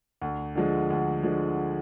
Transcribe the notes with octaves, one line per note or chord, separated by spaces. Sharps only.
D2
D3 F3 G#3
D2
D3 F3 G#3